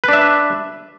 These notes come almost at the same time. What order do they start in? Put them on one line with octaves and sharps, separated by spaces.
B4 D4 E5